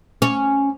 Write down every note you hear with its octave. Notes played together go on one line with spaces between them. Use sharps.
C#4